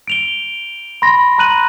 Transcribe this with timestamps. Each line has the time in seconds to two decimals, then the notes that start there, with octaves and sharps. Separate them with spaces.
0.08 D7 F7 G7
1.02 B5 C6 A#6
1.38 A#5 C6 F#6 D#7 F#7